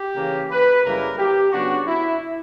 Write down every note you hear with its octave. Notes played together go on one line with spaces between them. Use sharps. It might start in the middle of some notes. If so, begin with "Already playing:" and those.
Already playing: G4
C#3 E3 A#3
B4
F#2 C#3 G3 A#3 E4 A#4
G4
C#3 F#3 B3 D4 F#4
E4